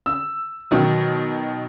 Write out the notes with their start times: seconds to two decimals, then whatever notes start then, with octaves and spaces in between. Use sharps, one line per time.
0.06 E6
0.71 B2 D#3 F#3